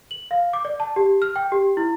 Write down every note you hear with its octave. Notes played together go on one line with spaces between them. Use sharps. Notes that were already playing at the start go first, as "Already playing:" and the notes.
F#7
F5
D6
D5
A5
G4
F6
G5
G4
E4